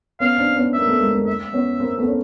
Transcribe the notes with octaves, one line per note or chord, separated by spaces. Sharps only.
B3 C#4 F5
C4 D4
B3 C#4
A#3 E5
A3 B3
G#3 A#3
G#3 A#3
E5
B3 C#4
A#3 C4
A3 B3
C#4